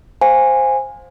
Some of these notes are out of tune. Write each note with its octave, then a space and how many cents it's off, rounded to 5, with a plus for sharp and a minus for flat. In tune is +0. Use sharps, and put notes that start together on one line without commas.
C5 +0 F5 +25 G#5 -15